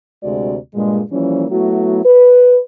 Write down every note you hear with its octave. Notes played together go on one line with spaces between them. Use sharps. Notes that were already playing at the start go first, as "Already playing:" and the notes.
D2 C3 G#3 F#4 D5
G2 A#2 G#3
E3 F3 G3 A#3 C#4
F#3 A3 B3 E4 F#4
B4